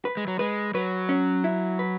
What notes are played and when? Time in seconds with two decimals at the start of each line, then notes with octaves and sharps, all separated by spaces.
0.05 B4
0.17 G#3
0.27 F#3
0.39 G#3 B4
0.74 F#3 B4
1.09 C#4
1.44 E4
1.79 B4